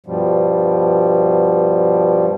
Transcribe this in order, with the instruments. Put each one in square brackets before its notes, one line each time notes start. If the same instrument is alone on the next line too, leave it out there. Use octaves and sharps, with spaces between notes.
[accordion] G2 B2 F3 G3